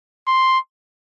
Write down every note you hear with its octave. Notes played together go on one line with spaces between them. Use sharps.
C6